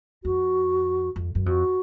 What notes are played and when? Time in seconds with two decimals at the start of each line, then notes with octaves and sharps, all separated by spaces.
0.24 F2 F#4
1.16 F2
1.35 F#2
1.46 F2 F#4